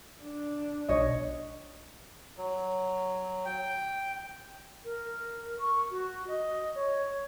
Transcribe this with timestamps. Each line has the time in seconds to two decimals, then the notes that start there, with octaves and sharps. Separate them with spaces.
0.22 D4
0.89 B1 C#5 D#5
2.37 F#3
3.45 G5
4.85 A#4
5.59 C#6
5.91 F#4
6.28 D#5
6.75 C#5